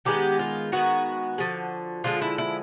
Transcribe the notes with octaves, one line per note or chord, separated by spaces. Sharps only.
D#3 G#3 B3 G4
F4
D#3 G#3 B3 F#4
D3 F3 G#3
D3 F3 G#3 F4
E4
E4